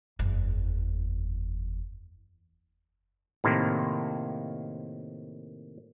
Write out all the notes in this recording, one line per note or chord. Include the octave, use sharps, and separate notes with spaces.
F#1 E2
A2 C3 D#3 A#3